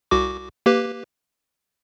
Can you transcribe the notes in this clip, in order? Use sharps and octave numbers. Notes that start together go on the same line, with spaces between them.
C2 F#4 D6
A#3 G4 B4